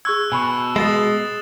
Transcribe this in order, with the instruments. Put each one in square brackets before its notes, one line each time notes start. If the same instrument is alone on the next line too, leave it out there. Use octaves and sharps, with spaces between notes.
[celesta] G#4 C#6 G#6 [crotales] E6 F#6
[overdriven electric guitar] B2 [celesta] G#5 B5 C#6
[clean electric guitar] G#3 [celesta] G#4 [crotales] D#6 A6 E7